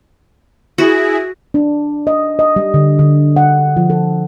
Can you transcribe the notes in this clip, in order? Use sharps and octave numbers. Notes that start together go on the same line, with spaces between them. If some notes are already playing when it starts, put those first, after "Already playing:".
E4 F#4 G#4
D4
D#5
D#5
G3
D3
D3
F#5
F3
A4